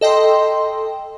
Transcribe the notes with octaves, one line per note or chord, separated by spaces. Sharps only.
A4 D#5 G5 C6